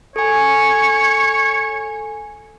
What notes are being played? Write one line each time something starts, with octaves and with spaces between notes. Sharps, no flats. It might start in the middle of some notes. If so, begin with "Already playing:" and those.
A4 C#5 G#5